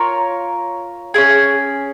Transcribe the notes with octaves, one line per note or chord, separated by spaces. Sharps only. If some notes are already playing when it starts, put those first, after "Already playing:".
Already playing: F4 A#4 C#5
C#4 E4 G#4